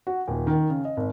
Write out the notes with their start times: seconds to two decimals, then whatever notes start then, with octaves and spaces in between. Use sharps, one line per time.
0.07 F#4
0.28 D#1
0.47 D#3
0.70 C#3
0.85 D#5
0.97 G#1